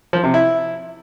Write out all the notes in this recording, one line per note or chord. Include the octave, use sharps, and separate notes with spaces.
F3
C3
E4